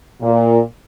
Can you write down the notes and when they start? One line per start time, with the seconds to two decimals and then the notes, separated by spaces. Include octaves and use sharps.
0.22 A#2